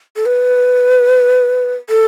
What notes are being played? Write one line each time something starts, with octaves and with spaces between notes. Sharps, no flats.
A4
B4
A4